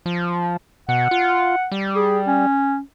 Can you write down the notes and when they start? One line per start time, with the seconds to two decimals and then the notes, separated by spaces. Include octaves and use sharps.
0.06 F3
0.89 B2 F#5
1.11 F4
1.72 G3
1.96 G#4
2.27 C#4